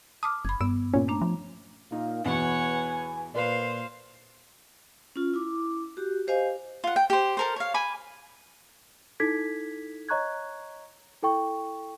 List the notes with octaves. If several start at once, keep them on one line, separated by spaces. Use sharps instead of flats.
A5 D6 D#6 F6
F#1 B5 G#6
G2 B3 E6
A#2 C#4
A3 D4 A#5
F3
A#2 D#4 F5
E2 B2 B4 C#5 F#5 G#5
A#2 B4 C5 D5 F5
C#4 F4
E4 D6
F#4 G4
G4 C5 D#5 F5 G#5
F4 F#5
G5
G4 C5
A4 A#4 C5
C#5 F5
G#5 B5 D6
D#4 E4 A4 G#6 B6
C#5 D#5 A#5 C#6 F#6 G#6
E4 A4 G5 C#6